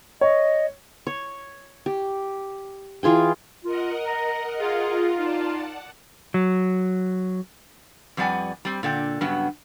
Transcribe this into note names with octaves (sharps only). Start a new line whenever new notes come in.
C#5 D#5
C#5
G4
E3 F4 G#4 G5
F4 A#4 D#5 F#5
A#5
F4 G#4
D#4 D5 A5
F#5
F#3
F2 G3 B4 D5 F#5 G#5
G3 C4
A#2 D3 D5 G5
G2 C#3 F#3 B3